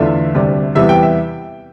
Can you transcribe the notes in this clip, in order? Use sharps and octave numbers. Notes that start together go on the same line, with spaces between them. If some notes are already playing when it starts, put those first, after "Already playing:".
Already playing: E2 D3 A3 D4 F4 E5
D2 C3 G3 D4
E2 C3 E3 G3 B3 E5
G5
E5